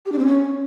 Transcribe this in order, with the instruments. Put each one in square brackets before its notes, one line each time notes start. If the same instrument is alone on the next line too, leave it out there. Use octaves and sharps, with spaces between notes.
[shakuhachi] G4
D4
C4
C#4